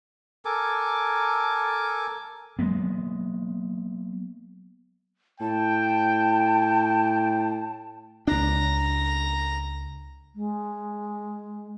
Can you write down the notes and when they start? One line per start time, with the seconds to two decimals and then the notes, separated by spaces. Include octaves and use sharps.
0.45 A4 A#4 G#5 D6
2.59 F#3 G#3 A#3 B3
5.40 A2 G5 A5
8.27 C#2 D4 A#5
10.34 G#3